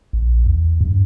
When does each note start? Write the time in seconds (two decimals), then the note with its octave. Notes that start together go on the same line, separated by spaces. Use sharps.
0.13 A#1
0.46 E2
0.81 G2